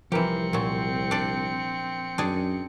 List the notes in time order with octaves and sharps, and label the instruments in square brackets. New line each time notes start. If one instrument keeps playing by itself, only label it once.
[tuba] C2 [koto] E3 G4 [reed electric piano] F3 A#4 [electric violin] C4 C#7
[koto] A#2 F#3
D4 D5
[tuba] F#2 [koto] D4 G#4